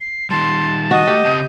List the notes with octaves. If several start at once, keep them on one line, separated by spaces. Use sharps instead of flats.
C7
D#3 G3 A5 C6
F#4 D#5
A3 G4
C#3 C4 A5 G6